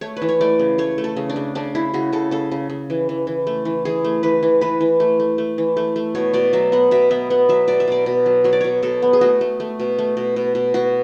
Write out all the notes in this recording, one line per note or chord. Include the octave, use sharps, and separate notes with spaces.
A3 C#5
B4
E3
C#5
A3 D5
C#3
A3 C#5
A3
A4
C#3
D4
C#3
C#3 D4
C#3 E4
C#3 F#4
C#3 A4
C#3 A4
C#3
C#3
E3
E3
E3
A3
E3
E3 G#4
A3
E3 B4
E3
E3 B4
E3
A3
A3
A3
E3
A3
A3
B2 C#5
B2 D5
F#3 E5
B3 F#5
B2 E5
B3 E5
B3 F#5
F#3 E5
B2 D5
E5
B2 D5
B2
F#3
F#3 C#5
D5
B2 C#5
B2 A4
B3
G#4
A3 F#4
A3
A3
B2
A3
B2
B2
B2
B2 F#4